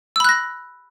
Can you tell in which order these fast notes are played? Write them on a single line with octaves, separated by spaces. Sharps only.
E6 B5 F#6 A#6